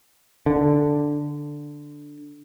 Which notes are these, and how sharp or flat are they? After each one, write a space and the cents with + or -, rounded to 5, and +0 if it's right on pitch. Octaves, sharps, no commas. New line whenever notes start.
D3 +0